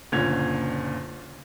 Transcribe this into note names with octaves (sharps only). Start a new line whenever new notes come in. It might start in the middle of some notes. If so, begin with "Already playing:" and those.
F#1 A#2 D3 C#4 G#6 F7